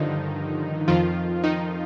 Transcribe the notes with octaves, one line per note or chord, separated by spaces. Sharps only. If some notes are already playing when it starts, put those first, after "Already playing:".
Already playing: G2 D3 D#3 F3 D#4
F2 D#3 F3 F4
D#3 D#4